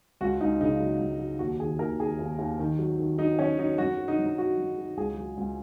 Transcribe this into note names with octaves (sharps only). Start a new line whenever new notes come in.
C#2 F#4
C#2 D#4
C#3 D#4
F#3
C#2
F#3
D#2 F#4
D#3 G#4
D#2 A#4
D#3 G#4
D#2
D#2
D#3
F#3
D#3
F#3 D#4
F#3 C#4
F#3 D#4
F#2 F#4
F#3
D#4
F#2
D#4
F#3 F#4
F#2
F#3
C#2 G#4
F#3
C#2